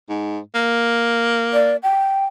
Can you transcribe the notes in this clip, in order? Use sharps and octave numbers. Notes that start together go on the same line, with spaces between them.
G#2
A#3
D5
G5